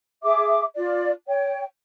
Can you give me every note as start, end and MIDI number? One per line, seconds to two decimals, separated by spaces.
0.23 0.64 68
0.23 0.64 76
0.23 0.64 86
0.76 1.11 65
0.76 1.11 74
1.27 1.64 73
1.27 1.64 79